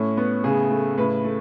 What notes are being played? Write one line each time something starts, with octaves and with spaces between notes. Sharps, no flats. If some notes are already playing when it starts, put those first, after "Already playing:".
Already playing: A2 C#4
B3
C#3 G#4
A3
A2 B4
A3